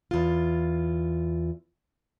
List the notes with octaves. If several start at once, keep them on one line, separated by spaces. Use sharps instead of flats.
E2 F4